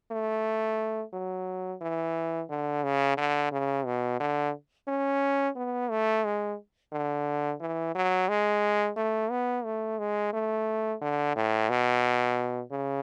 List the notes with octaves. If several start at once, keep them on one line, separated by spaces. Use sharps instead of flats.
A3
F#3
E3
D3
C#3
D3
C#3
B2
D3
C#4
B3
A3
G#3
D3
E3
F#3
G#3
A3
B3
A3
G#3
A3
D3
A2
B2
C#3